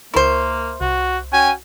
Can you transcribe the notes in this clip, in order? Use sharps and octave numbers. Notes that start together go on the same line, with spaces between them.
C#2 A#3 E4 A#4 C5 C#6
C2 F#4
C#4 F#4 G5 G#5